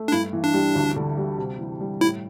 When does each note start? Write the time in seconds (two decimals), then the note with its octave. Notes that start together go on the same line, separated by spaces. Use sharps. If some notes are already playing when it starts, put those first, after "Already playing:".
Already playing: A3
0.08 D4
0.12 G2 E4
0.33 E3
0.44 D4
0.54 G3
0.75 D2
0.96 D3
1.17 G3
1.38 C3
1.59 E3
1.80 G3
2.01 A2 E4